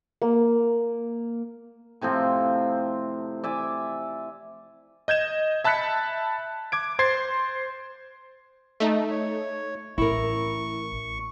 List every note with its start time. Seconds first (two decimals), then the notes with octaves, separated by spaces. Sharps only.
0.22 A#3
2.01 A2 C3 F3 C4
3.44 D5 E5 G#5
5.08 D#5 G6 G#6 E7
5.64 E5 A5 B5 F#6 B6 C#7
6.72 D6 G#6 D7
6.99 C5 C6 G#6 A6 C7
8.80 A3 D#4
9.10 C#5
9.98 A1 E4 A#4 C#6